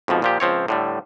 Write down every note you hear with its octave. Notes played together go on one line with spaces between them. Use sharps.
F2 G#2 B2 F3
A#2 F3 G4
C#2 F3 C4 C#5
A2 D3 G3